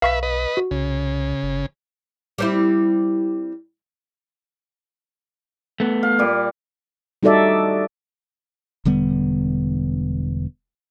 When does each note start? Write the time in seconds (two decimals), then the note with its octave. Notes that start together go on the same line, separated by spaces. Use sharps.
0.02 B1 B4 E5 F5 C#6 B6
0.23 B4 D#5
0.57 F#4
0.71 C2 C#3
1.43 G1
2.38 G3 C4 E4
5.80 A3 B3
6.03 F5
6.19 A#2 G3
7.23 G3 D#4 F#4 A4 D5 E5
8.85 E1 D3 G3 B3